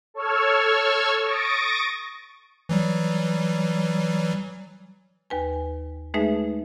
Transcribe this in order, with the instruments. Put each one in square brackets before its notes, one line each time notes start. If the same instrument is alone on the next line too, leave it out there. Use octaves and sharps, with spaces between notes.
[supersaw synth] A4 C#5 C#6 E6 F6 G#6
C#6 D#6 A6 A#6 D7
[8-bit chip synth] E3 F#3 G3
[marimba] D#2 B4 G#5
G#3 A3 D#4 G#4 B4 E5